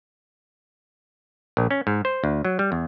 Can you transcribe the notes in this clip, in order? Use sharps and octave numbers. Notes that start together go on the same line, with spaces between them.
A#1
C#4
G#2
C5
D2
F#3
G3
E2